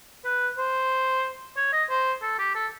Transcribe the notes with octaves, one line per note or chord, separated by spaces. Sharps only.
B4
C5
C#5
D#5
C5
A4
G4
A4